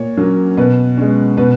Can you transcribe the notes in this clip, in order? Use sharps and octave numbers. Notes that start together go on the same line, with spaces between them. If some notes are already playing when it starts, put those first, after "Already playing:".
Already playing: A#2 C#5
F#3 A#3 C#4
B2 B4
G#3 C#4
B2 B4